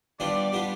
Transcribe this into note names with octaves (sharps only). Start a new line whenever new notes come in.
G3 B3 D4 F4 D5
G3 B3 D4 F4